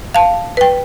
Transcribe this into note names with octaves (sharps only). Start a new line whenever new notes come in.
F5 A5
B4 G5